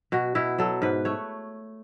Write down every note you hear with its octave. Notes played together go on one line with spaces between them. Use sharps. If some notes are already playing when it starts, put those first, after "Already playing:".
B2 F#4
B2 E4
F#3 A4
G#2 B4
A3 C#5